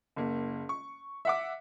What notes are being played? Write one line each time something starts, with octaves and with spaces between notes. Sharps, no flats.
F#1 A#3
C#6
E5 F#5 D6